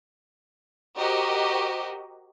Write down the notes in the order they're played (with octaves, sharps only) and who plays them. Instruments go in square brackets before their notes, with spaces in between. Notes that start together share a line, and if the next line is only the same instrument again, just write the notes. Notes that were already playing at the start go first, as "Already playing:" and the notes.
[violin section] F#4 G4 A#4 C5 D#5